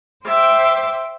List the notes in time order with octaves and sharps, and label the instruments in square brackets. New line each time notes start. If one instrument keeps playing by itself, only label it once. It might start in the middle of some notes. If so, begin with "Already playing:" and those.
[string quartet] C5 E5 G5 D6